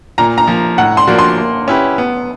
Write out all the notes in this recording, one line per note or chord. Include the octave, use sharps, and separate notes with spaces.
A#2 A#5
A#5
F3 A#3
A2 F#5
C6
F3 A#3 D4 F#4
C6
A#3
C#4 E4 G4 B4
B3